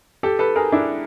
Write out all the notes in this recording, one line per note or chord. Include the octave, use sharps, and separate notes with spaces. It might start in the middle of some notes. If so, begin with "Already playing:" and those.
G4 A4
A4 B4
G#4 A#4
D4 E4